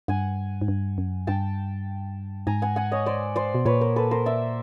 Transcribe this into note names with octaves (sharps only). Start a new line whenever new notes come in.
G2 F#5 G#5
G#2
G2
F#2
G2 G5 A5
G#2 G#5 A#5
F#5 G#5
F#5 G#5
C#5 D#5
C5 D5
C5 D5
B2
A#2 B4 C#5
A#4 C5
A4 B4
A#4 C5
D5 E5